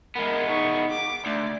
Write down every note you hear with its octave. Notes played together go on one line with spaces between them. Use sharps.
G#3 B3 A#4
D#4 C#6
D6
D2 D5